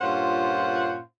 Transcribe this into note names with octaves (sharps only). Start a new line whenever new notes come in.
G2 A#2 C#4 F4 C5 F#5